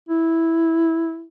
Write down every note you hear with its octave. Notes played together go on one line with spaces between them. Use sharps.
E4